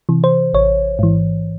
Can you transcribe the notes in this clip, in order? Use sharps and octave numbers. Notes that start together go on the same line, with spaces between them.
C3 E3
C5
A1 C#5
G#2 E3